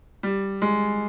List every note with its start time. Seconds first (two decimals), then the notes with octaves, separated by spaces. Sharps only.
0.23 G3
0.62 G#3